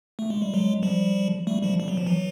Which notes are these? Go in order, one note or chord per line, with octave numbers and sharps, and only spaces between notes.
A3
G#3
G3
F#3 G#3
F3 G3
G3 A3
F3 G3
G3
F#3
F3
E3 F#3